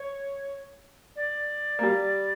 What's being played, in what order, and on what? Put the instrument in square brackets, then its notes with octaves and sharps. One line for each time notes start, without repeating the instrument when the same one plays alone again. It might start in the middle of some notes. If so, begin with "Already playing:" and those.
Already playing: [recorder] C#5
D5
[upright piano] A#3
G3